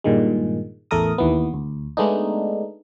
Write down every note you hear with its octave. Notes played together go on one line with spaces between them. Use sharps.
G2 A#2 D#3 G#3
A1 E2 A3 A4 A#4 D#6
D#2 E3 B3
D2
G#3 A3 B3 D4 D#4